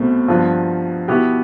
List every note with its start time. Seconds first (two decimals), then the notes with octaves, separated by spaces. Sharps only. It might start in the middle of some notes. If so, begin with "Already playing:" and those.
Already playing: C2 B2 A3 C4
0.28 G2 F3 B3 F4
1.08 B2 B3 E4 G4